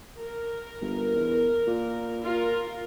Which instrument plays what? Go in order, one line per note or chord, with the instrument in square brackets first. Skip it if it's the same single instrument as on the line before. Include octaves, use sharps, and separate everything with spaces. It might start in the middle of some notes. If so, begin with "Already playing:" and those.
[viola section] A#4
[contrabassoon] G1
E2
A#2
[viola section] F4 A#4